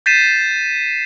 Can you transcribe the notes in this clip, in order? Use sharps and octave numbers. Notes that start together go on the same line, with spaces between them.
G6 A6 B6 C7 D#7 E7